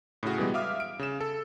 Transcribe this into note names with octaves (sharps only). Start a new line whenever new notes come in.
A2 C#3 F#4
B2 E3 G3 G#3
E5 F5 D6 D#6 F6
D7
C#3 E7
A4